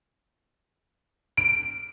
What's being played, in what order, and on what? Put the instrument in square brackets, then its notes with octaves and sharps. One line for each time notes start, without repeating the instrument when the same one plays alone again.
[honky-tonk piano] D7